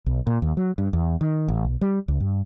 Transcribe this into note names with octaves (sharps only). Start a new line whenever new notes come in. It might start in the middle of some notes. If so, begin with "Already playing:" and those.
B1
A#2
D#2
F#3
G2
E2
D#3
A1
B1
G3
C#2
G2